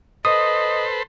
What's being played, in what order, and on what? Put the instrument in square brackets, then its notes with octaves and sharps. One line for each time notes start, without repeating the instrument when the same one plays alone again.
[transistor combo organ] A4 B4 C5 [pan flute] D#5 [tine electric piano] D#6